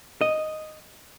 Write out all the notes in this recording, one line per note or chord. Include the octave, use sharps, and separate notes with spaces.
D#5